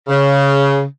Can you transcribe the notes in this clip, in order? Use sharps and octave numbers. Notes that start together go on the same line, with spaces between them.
C#3